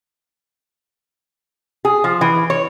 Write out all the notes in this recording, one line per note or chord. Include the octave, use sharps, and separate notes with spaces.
G#4
F3
E3
C#5